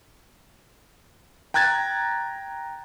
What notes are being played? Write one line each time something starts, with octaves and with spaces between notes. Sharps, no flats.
G5 A#5 F#6 G#6 A6